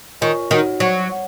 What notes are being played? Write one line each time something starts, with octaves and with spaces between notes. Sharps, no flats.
D#3 F4 A#4 C#5 G#5 C#6
D#3 D#4 F#4 C#5 F#5
F#3 C#5 F#5 C#6
C#5 F#5